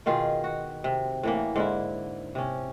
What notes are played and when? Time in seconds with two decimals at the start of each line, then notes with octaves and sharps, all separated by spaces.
0.06 B2 D#3 F4 G#4
0.44 F#4
0.84 C3
1.23 A2 E3 A#3
1.56 G#2 D3 E4
2.35 C3 C#4